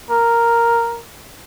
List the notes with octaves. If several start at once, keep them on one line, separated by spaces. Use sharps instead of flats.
A#4